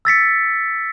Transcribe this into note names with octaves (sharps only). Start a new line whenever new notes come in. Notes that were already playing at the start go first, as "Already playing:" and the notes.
E6 A6 B6 C#7